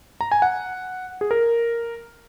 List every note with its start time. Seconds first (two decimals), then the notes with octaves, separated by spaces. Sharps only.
0.21 A#5
0.32 G#5
0.42 F#5
1.21 G#4
1.31 A#4